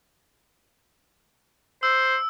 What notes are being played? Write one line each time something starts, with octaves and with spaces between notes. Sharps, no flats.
C5 E6